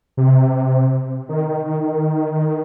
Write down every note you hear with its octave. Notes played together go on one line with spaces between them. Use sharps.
C3
D#3